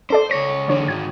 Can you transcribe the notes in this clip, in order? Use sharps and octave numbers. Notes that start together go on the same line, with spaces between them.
C#4 A4 C5 D5
C#2 C#5 A#6
E2 D3 D4 C#5
G#2 D#3 G#6